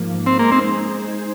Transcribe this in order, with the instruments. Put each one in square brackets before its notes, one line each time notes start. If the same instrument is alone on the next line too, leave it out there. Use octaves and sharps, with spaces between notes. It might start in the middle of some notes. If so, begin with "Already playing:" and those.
Already playing: [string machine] G#2 F3 A#3
[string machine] G#3 D#4 G#4 C5 [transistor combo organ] C4
[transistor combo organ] A#3
C4